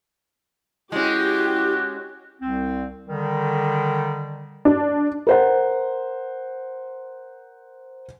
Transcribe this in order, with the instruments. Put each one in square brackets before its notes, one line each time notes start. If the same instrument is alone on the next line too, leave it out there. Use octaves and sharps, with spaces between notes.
[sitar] G#3 C#4 [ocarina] E4 [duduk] F#4 [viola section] G4
[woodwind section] C2 C4
D3 D#3 G3
[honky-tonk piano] D4
[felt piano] A#4 C5 F#5